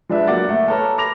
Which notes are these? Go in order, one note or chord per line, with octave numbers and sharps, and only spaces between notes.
F3 G#3 D4 B4 E5
F#3 A#3 D5 F#5 D6 A6
A3 A#3
A4 B4 C#5 A#5 D6 F6
B5 D6 A#6 F7